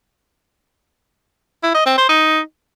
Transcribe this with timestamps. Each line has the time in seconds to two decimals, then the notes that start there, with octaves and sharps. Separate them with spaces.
1.63 E4
1.75 D#5
1.86 C4
1.97 C5
2.09 D#4